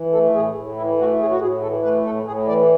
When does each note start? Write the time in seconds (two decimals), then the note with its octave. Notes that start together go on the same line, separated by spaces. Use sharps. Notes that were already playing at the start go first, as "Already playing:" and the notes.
Already playing: E3
0.12 A3 A4
0.34 A2 G#4
0.55 A2
0.76 E3 E4
0.98 A3 F#4
1.19 A2 G#4
1.30 F#4
1.41 A2 G#4
1.61 E3 A4
1.83 A3 B4
2.04 A2 A4
2.26 A2 G#4
2.47 E3 D5